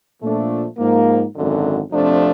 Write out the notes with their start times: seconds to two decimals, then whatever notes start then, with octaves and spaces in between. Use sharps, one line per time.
0.21 A#2 F3 A3 D4
0.78 G#2 F3 A#3
1.35 G#1 F#2 D3
1.93 F2 C3 F3 A3 D4